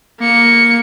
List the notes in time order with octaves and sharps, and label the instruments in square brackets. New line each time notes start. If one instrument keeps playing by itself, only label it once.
[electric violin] A#3 C#7